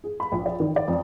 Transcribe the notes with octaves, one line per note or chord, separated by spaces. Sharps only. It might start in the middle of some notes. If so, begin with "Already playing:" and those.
G#4
B5
A#1
D5
D#3
D5
F2